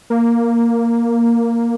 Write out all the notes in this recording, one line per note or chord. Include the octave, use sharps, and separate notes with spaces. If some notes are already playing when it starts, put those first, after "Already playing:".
A#3